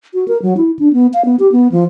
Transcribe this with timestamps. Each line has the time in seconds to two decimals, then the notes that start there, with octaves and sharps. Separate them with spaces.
0.14 F#4
0.28 A#4
0.42 F#3
0.57 E4
0.79 D4
0.93 B3
1.13 F5
1.25 B3
1.39 G4
1.52 B3
1.72 F3